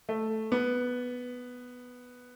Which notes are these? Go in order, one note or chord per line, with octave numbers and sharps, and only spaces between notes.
A3
B3